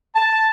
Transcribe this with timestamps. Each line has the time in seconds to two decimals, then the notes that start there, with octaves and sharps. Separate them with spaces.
0.15 A5